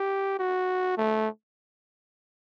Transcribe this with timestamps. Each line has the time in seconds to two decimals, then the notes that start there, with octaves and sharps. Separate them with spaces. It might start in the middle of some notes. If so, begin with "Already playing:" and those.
Already playing: G4
0.39 F#4
0.97 A3